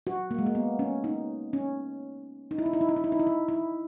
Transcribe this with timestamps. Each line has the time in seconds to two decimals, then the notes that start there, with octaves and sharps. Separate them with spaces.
0.07 F#4
0.31 A#3
0.39 G#3
0.46 A#3
0.55 B3
0.79 C#4
1.04 D#4
1.53 C#4
2.51 D#4
2.58 E4
2.66 D#4
2.73 E4
2.81 D#4
2.89 E4
2.96 D#4
3.04 E4
3.12 D#4
3.19 E4
3.27 D#4
3.49 E4